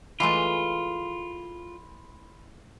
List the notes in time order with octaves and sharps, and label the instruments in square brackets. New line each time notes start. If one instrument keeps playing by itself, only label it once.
[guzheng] E3 G#3 A3 [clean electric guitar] F4 [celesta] B5 C6 D#7